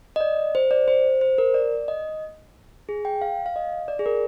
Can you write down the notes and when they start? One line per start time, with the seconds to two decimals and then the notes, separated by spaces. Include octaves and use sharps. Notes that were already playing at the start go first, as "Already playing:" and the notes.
0.16 D#5
0.21 D5
0.55 C5
0.71 D5
0.88 C5
1.21 C5
1.38 A#4
1.54 D5
1.88 D#5
2.89 G#4
3.05 G5
3.22 F5
3.46 F5
3.56 D#5
3.88 D5
3.99 G#4
4.06 A#4